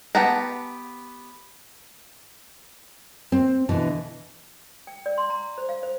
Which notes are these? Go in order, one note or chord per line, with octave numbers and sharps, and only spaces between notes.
B3 G4 F#5 A5 A#5
C4
B2 D3 E3
G5
D5
C6
A#5
C5
F5
C5